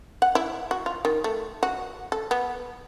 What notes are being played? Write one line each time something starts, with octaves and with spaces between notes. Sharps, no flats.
F#5
E4
F#4
F4
D#3
A3
F#4
A4
B3